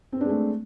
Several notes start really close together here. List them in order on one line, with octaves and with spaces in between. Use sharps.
C4 B4 D4 G#3 A3